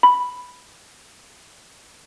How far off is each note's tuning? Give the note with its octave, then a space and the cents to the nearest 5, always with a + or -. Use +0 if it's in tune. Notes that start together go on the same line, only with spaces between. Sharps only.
B5 +0